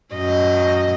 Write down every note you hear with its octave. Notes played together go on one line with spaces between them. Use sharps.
F#2 D#5